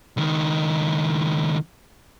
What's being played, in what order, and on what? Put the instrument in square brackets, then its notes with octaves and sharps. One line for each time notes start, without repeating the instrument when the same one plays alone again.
[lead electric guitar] C#2 D#3